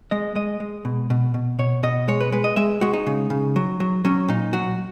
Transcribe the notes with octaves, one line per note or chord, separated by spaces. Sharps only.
G#3 D#5
G#3 D#5
G#3
B2
B2
B2
B2 C#5
B2 D#5
G#3 C#5
B4
G#3 B4
D#5
G#3 E5
G#3 F#4
D#4
C#3
C#3
F#3
F#3
F#3 C#4
A#2 D#4
F#3 F#4